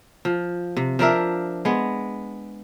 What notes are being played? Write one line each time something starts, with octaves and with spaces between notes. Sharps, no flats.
F3
C3
F3 D4 A#4 E5
G#3 B3